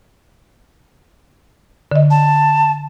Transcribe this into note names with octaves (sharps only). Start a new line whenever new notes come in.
D3 D#5
A5